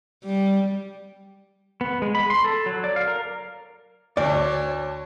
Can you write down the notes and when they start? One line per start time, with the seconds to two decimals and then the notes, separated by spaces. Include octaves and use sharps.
0.24 G3
1.81 B3
2.02 G#3
2.15 B5
2.30 C6
2.44 A4
2.66 F#3
2.84 D5
2.96 F5
3.08 A#4
4.17 D2 D4 C#5 D5